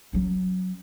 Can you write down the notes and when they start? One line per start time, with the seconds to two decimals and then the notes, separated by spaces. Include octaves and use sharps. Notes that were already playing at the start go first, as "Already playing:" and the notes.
0.13 F#3 C#4